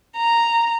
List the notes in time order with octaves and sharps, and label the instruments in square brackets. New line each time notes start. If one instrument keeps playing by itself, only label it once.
[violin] A#5